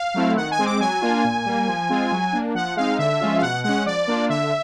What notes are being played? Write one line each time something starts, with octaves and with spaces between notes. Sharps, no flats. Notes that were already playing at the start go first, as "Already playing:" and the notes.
Already playing: F5
F#3 A3 C4 E4
D#3 F#5
G#5
G#3 C4
D6
F#3 G#5
A#3 D4 F4
A#2
G3 A#3
F3
G#3 C4 F4
F#3
A#3 D4
F3 F#5
G#3 C4 D#4 F5
D3 E5
F3 G#3 C#4 F4
F5
B2 F#5
G#3 C#4 F#5
F3 D5
A#3 D4 F4
D3 E5